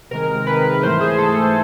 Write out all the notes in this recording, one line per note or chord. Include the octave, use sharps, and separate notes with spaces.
C3 D#3 G#3 A#4
C3 D#3 G#3 B4
G#2 E3 A3 C5
G#4
G#2 E3 A3 A4